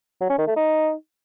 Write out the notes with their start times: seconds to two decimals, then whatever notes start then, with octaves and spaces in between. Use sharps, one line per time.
0.21 F#3
0.30 C#4
0.38 D#3
0.47 A3
0.56 D#4